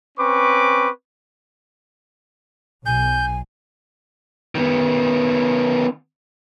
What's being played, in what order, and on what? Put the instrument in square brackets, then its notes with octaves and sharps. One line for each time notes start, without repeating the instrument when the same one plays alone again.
[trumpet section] C4 C#4 B4 C#6 D6
[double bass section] B1 [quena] G#5 [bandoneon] G6
[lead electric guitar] D#3 B3